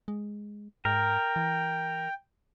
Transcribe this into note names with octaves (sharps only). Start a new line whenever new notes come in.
G#3
G#2 A#4 G5
E3